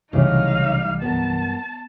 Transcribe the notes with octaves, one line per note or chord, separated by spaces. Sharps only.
C2 C#3 E3 F#3 G3 A3 D#4 F5
G2 F#3 B3 A#4 A5